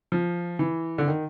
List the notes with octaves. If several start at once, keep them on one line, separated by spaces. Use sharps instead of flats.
F3
E3
D3
D#3